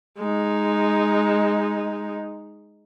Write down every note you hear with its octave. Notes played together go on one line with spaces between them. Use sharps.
G#3 D#4